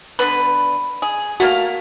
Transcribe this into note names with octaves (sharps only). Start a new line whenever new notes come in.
D3 B3 B4
G#4
A3 A#3 F#4 F5